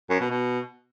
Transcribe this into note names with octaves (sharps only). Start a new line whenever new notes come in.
F#2
B2
B2